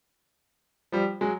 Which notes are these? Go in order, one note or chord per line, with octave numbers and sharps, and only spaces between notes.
F3 G3
F#3 G#3